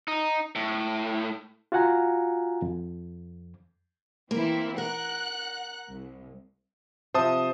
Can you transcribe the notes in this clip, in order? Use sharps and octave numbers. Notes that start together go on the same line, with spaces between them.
D#4
A2
F4 F#4 F5 F#5 G#5 A#5
F2
E3 A#3 C4 E4
A#4 F#5 F#6
C2
C3 F3 C5 A5 D#6